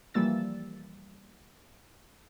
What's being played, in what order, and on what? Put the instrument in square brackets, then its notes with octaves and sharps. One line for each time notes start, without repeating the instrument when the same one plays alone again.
[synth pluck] E3 F3 G3 A#3 E6 A6